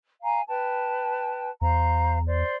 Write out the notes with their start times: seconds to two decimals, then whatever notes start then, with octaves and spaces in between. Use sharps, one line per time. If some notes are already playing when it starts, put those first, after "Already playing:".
0.23 F5 G#5 A#5
0.47 B4 G5 A5
1.61 E2 C5 F5 A#5
2.25 C5 D5